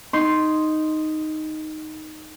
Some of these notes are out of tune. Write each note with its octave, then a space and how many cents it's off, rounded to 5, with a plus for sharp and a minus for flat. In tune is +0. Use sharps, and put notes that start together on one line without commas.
D#4 +0 C6 +0